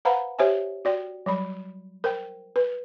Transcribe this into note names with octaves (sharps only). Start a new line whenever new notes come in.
B4 C5 F5 F#5 A#5 B5
G4 C5 C#5 E5 G#5
F#4 D5 G5
F#3 G3 B5
A#4 C5 G5
B4